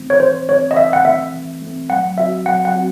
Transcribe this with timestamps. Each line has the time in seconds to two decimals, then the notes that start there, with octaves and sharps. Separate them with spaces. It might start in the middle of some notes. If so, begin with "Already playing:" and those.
Already playing: E3 A3 C4
0.10 C#5
0.20 E3 C5
0.48 A3 C4 C#5
0.71 D#5
0.77 E3 E5
0.93 F#5
1.05 A3 C4 E5
1.33 E3
1.62 A3 C4
1.90 F#3 F#5
2.17 C4 F#4 E5
2.46 F#3 F#5
2.65 F#5
2.74 C4 F#4